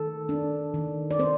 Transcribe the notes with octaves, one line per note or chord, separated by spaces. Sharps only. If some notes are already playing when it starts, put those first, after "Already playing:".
Already playing: D#3 A4
D4
D#3
D5
C4 C5